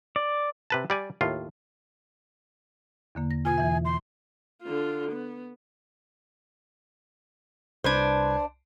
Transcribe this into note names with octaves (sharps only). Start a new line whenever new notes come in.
D5
C3 B4 A5
G3 D5 G#5
D#2 A2 F4
E2 D3 A#3
A#6
B2 F4 G#5
E2 E3 E5
C6
D3 F4
B3
C2 D4 B4 C5 G#6